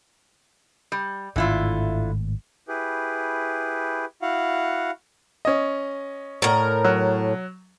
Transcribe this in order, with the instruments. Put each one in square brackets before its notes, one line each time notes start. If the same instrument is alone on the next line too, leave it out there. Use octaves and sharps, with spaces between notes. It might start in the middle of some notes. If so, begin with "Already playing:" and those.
[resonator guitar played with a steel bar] G3
[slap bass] G#1 A2 [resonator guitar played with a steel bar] D3 E4 F4
[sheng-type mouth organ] E4 G4 G#4 B4
E4 F#4 F5 F#5
[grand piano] C#4 D#5
[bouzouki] A2 A#4
[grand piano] F#3